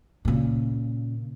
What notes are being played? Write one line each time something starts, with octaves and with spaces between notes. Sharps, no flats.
A#2 C#3